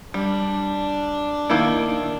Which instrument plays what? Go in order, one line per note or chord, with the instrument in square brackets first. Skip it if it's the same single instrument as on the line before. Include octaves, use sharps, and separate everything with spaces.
[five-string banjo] G3 [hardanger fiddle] D4
[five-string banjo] D#3 A#3 E4